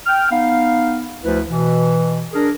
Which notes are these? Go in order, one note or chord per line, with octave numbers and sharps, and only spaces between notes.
G5 F6
B3 D#4 F5
D2 F3 E4 B4
B2 E3
D4 G#4 A#4